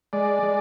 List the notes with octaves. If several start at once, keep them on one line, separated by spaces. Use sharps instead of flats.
G#3 D5
G#3